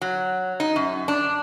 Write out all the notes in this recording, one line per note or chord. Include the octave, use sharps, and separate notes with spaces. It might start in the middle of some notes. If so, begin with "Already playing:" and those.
F#3
D#4
F#2
D4